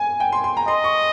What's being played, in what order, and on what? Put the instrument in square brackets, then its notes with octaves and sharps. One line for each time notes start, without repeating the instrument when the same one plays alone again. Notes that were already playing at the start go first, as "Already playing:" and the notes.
Already playing: [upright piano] G#5
G5
C6
C6
A#5
[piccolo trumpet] D#5 [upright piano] C6
[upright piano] C#6